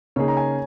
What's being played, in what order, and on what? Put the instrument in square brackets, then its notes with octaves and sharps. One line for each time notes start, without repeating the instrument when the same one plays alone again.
[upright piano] C#3 A#3 D#4 G#4 [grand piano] C#5
[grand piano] A#5
G#5